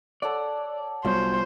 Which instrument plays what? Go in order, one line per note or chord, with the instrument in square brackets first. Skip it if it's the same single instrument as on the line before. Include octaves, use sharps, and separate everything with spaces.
[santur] A4 C#5 F#5 [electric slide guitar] D5
[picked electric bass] C2 G3 B3 [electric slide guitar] F#3 [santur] F4 C#5 G#5 [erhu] C5